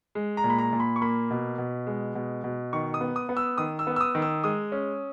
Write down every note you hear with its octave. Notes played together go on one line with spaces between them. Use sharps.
G#3
A#5
A#2
B5
A#5
A#2
B5
C#6
A#3 B5
B2
B2
G#3
B2
B2
D#3 C#6
D#6
B3
D#6
B3
E6
D#3 D#6
E6
B3
E6
D#6
D#3
E6
G#3 D#6
C#4